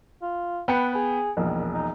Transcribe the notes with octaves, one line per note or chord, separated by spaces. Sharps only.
F4
B3 B4 G5 C#7
G#4
E1 A#1 D#3
D#4